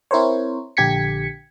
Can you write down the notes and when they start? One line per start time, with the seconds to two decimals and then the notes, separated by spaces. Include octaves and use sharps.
0.11 C4 E4 A#4 C5 C#5
0.77 A#1 D3 G4 G#6 B6 C#7